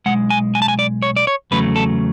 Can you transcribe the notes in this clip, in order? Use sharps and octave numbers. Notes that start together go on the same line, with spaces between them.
B1 B2 G#3 F#5
G#5
G#5
A5
G#5
D5
C#5
D5
C#5
E2 C#3 F#3 A3 B4
A4